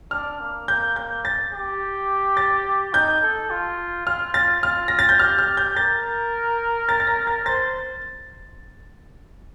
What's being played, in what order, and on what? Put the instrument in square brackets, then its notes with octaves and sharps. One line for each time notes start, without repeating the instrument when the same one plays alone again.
[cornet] D4 [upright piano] F6
[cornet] A#3
[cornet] A#3 [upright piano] G6
[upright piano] G6
A6
[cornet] G4
[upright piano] A6
[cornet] D#4 [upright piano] G6
[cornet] A4
F4
[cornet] F4 [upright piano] F6
[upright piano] A6
[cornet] F4 [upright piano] F6
[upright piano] A#6
A6
G6
[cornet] G4 [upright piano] F6
[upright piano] F6
G6
[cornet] A#4 [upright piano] A6
[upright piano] A6
A6
A#6
A6
[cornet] C5 [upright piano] A6